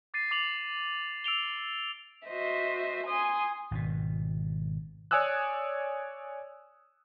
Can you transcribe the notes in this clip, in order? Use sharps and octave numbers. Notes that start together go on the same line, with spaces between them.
D6 A6 C7 D#7
D6 F7 F#7
E6 D7 F7 G7
F#4 C5 D#5 E5
G#5 C6 D#6
G#1 B2
C#5 D5 G#5 D#6 E6 F#6